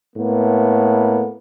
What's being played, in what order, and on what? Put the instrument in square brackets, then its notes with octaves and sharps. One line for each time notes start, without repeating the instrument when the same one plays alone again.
[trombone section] A2 A#3 B3